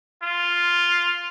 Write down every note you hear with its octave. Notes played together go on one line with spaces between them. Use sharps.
F4